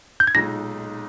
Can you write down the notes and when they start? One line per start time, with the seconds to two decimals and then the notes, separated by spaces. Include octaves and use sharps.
0.20 G6
0.27 G#6
0.35 B1 A#2 G#3 D#4 A#6